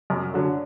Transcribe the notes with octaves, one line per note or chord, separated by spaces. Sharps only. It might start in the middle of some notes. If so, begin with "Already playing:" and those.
F#2
D3 F#3